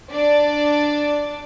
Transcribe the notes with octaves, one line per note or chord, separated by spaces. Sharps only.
D4 D5